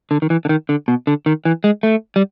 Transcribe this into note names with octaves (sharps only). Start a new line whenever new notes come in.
D3
D#3
E3
D3
D#3
D3
B2
D3
D#3
E3
G#3
A3
G3